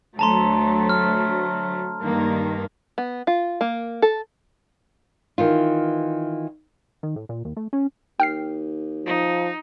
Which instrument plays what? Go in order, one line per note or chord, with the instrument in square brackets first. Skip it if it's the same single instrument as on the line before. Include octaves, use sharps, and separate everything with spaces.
[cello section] D2 F#3 A3 [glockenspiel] A5 A#5 C6
[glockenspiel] F6
[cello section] G2 D#3 A#3
[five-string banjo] B3
F4
A#3
A4
[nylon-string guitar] D#3 E3 F4
[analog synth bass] D#3
A2
A#2
D#2
A3
C#4
[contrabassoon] D#2 [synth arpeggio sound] G5 F6 C7
[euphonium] F3 [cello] D#4